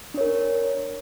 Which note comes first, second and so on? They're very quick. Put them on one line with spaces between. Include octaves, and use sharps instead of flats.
D4 C#5 A#4